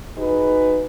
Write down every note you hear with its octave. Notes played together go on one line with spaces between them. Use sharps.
D#4 F#4 G#4 B4